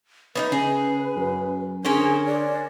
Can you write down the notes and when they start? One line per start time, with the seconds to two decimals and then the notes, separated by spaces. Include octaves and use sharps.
0.35 B3 C#4 D#4 B4
0.52 C#3 G#4
1.16 F#2
1.85 D3 C#4 G#4 A#4 C5
2.26 D5